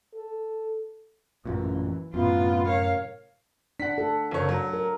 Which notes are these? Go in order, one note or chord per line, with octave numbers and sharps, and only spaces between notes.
A4
A1 F#2 A#2 E3
F#2 A2 C3 B3 F4
A#4 C#5 F5
D4 F#5 B6
A4
F#1 C#5
F#3
A#4